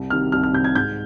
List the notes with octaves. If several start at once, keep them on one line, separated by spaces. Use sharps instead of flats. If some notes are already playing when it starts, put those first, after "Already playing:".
Already playing: C2
C3 D#3 F6
C2 F6
F6
C3 D#3 G6
G#6
G#2 G6